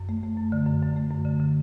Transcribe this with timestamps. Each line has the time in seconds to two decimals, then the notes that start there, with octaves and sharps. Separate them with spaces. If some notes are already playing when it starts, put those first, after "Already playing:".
Already playing: F#2
0.09 A3
0.23 A3
0.37 F#2
0.52 D3
0.66 F#2
0.82 F#2
0.96 A3
1.11 F#2
1.25 D3
1.40 D3